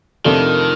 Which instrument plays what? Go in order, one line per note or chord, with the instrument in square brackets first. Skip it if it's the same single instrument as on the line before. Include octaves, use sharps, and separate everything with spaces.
[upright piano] F2 C3 F3 A3 D4 [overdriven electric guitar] D#3